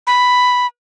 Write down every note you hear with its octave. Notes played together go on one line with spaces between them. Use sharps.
B5